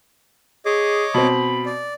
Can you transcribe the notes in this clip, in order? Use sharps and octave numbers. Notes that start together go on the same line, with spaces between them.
G#4 C#5 D#5 D6
B2 C4 B5
D5